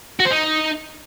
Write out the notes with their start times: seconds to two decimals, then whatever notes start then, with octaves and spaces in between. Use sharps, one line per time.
0.20 F#4
0.25 C5
0.31 D#4